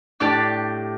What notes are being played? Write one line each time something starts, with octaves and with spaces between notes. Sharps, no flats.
A2 D4 G4 D5 A5